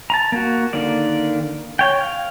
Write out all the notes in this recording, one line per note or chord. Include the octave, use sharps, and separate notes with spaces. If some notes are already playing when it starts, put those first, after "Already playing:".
A5 A#5
A#3 F#4
D3 D#3 A#3 D5
C#5 G5
F5